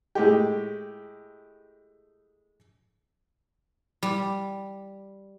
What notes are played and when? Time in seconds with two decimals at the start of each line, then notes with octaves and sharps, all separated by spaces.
0.15 A2 G#3 G4
4.03 G3